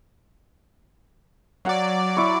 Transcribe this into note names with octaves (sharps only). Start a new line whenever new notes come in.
F#3 D5 F5 F#5
E4 C#6